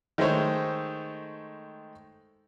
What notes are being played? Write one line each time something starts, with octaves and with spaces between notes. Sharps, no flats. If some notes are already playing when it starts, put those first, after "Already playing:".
D#3 G#3 A3 A4 C5 C#5